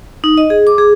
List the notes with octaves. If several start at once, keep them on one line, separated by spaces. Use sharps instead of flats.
D#4
D#5
G#4
D6
G#4